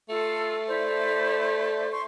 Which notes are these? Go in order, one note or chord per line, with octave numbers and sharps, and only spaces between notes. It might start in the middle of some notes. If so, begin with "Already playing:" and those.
A3 F4 A4
E4 C5 D5
C6 C#6